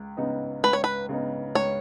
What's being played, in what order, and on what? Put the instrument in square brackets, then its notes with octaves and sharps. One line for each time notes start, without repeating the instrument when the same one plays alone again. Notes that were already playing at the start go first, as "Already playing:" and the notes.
Already playing: [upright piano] C#2
C#3 B3 D#4
[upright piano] C#2 [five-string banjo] B4
[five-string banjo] C#5
B4
[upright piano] C#3 B3 D#4
[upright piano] C#2 [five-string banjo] C#5